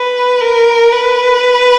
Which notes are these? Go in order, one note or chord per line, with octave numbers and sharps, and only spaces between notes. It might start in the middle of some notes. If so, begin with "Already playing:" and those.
Already playing: B4
A#4
B4